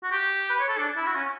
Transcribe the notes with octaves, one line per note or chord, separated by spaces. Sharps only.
F#4
G4
B4
C#5
A4
D4
E4
F#4
C#4